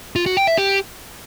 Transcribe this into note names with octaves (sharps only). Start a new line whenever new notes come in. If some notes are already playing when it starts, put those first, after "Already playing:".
F4
F#4
G5
E5
G4